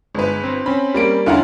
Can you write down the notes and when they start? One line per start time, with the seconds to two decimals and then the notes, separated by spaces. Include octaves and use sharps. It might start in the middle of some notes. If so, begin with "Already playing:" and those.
0.15 G1 G#3 B4
0.44 C4
0.66 C4 C#4 B5
0.94 G3 A#3 D7
1.26 F2 D3 C#4 E4 F4 F5 F#5 A#5